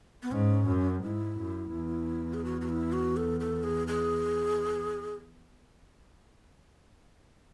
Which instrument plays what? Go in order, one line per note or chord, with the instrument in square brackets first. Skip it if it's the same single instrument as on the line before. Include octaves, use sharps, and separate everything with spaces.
[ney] B3
[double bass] G#2 [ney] C#4
[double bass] F#2
[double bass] G#2 [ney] E4
[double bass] F#2
E2
[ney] G#4
F#4
F#4
E4
F#4
A4
A4
G#4
G#4